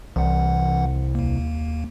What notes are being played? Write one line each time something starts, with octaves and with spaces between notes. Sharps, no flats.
C2 E3 F#5
D#2 A#3